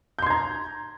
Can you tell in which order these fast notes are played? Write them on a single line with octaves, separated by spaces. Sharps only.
G6 C6 G#6 A#5